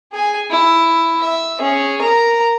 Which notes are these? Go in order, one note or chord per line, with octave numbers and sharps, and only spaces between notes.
G#4 G#5
E4
E5
C#4 G#4
A#4 A#5